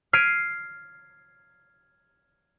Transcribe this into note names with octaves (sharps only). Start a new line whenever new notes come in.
F6 G#6 B6 C7 D7 D#7